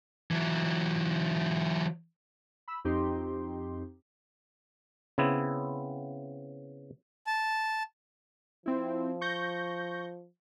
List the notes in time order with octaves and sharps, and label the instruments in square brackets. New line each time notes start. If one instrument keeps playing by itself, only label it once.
[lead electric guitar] E3 F#3
[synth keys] B5 E6
F2 C4 D#4 G4 C6
[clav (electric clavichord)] C#3 B3 C4 E4
[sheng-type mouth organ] A5
[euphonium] F3 [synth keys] C4 E4
[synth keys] C#6 G6 A#6